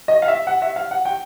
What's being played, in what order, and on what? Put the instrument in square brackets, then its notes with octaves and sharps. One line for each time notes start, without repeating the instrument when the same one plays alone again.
[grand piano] D#5
F5
E5
F#5
E5
F5
F#5
G5